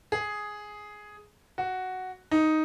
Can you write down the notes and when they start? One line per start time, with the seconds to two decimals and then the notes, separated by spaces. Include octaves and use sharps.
0.12 G#4
1.58 F#4
2.31 D#4